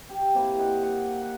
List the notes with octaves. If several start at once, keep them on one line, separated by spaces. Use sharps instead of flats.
G4
C3 A#3 E4
A#4 C5 D#5 F#5
F#5
F#5